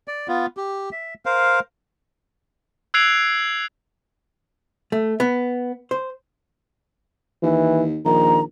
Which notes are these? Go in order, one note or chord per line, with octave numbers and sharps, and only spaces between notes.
D5
B3 F4
G4
E5
A#4 C5 F5
E6 F#6 G#6 C7 D7 F7
A3
B3
C5
D#2 E3
A#1 D#3 A#5